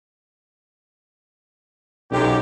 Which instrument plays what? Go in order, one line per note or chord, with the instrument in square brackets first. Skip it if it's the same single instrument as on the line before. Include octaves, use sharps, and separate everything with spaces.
[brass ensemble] B1 [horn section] F#2 G4